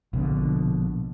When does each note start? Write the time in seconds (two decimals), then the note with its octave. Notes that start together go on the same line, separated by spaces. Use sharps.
0.13 A#1 B2 D3